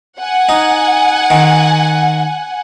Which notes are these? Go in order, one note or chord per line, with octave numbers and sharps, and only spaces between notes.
F#5 G#5
D#4
D#3